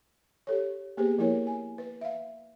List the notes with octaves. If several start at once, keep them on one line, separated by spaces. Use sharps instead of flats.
G4 A4 C#5
A#3 B3 G4 G#4 B4 C5
F3 A#3 E4 A#4 C#5
G#5
B4
E5 F5